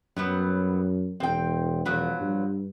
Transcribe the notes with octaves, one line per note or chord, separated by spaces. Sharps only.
F#2 F#3 G3 B3
E1 C4 G5
E1 F3 F#3 B3
G2